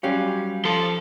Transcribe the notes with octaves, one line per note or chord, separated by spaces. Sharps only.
F#3 G3 C#4 G4 F5
F3 A4 C6